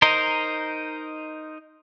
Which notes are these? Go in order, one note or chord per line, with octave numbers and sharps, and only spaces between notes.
D#4 A#4 C5 D#5